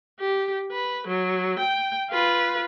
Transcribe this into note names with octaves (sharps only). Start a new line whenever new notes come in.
G4
B4
F#3
G5
F4 B4